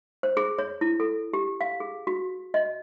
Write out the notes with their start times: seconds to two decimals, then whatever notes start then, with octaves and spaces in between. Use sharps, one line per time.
0.23 C5
0.37 G#4
0.58 C#5
0.81 E4
1.00 A4
1.33 G4
1.61 F5
1.80 G#4
2.07 F#4
2.54 D#5